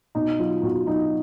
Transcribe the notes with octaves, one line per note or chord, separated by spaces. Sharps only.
B2 D#4
F#3 F4
B2 F#4
F#3 D#4